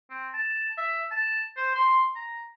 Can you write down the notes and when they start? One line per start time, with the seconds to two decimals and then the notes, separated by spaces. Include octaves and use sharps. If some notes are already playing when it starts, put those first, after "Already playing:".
0.10 C4
0.34 A5
0.77 E5
1.11 A5
1.57 C5
1.75 C6
2.15 A#5